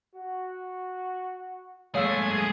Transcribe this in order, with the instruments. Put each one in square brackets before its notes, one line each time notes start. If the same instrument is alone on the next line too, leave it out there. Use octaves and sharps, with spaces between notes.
[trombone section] F#4
[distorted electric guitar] G#3 A3 [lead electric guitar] G#4 [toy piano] C#5 F5 E6